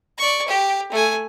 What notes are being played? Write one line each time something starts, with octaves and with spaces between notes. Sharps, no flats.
D5 C#6
G4
A3 G#5